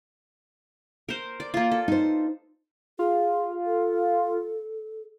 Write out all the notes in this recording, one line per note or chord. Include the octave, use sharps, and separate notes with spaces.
A#4 C5
D5
A#3 F4
A4
D#4 C5
F4 G#4
A4